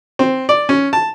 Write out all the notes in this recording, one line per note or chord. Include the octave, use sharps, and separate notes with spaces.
C4
D5
C#4
A5